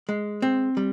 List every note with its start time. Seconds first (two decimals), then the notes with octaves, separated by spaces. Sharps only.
0.09 G#3
0.42 C4
0.77 G3